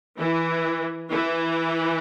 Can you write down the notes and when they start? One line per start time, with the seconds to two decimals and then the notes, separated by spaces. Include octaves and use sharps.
0.18 E3
1.11 E3